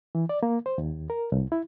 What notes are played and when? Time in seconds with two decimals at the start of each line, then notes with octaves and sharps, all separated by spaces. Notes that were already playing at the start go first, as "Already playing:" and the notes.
0.15 E3
0.29 D5
0.43 A#3
0.66 C5
0.78 D#2
1.10 A#4
1.32 C2
1.52 E4